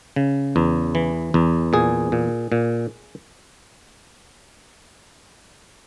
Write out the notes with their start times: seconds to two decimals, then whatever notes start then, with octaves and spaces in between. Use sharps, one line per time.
0.16 C#3
0.56 E2
0.95 E3
1.34 E2
1.73 A#2 G#4
2.12 A#2
2.52 A#2